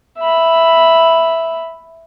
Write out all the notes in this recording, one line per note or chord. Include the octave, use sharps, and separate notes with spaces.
E5 B5